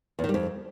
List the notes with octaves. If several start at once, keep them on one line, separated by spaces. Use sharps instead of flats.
E2
D#3
G3
F2